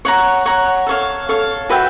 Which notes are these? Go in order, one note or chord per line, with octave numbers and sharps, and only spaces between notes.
C#5 F#5 A#5
C#5 F#5 A#5
A4 C#5 F5
A4 C#5 F5
F#4 B4 E5 G5